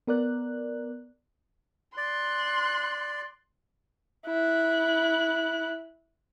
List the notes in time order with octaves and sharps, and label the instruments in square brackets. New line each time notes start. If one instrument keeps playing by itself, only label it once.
[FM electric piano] B3 A#4 D5 F#6
[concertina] D5 [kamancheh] C6 F#6
[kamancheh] E4 F#6